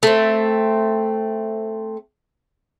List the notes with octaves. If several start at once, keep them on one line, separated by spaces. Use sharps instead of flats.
A3 C4